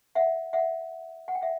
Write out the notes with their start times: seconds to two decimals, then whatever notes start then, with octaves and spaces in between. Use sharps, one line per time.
0.15 E5 F#5
0.53 E5 F#5
1.28 F#5
1.35 G5
1.42 E5 F#5